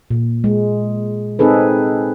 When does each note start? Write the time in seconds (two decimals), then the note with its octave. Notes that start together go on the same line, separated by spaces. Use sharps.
0.10 A#2
0.44 G#3
1.39 C4 D#4 G#4 A4 B4